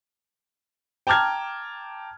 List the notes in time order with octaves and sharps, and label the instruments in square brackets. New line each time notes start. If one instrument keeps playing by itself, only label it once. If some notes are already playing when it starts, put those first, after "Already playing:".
[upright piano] G5 A5 A#5 D6 F6 G#6